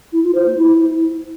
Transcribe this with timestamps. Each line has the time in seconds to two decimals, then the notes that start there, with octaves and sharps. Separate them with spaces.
0.12 E4
0.23 F4
0.35 C5
0.46 A#3
0.57 E4